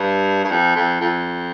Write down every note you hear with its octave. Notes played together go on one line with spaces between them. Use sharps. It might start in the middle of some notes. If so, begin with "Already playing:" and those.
Already playing: G2
G2
F2
F2
F2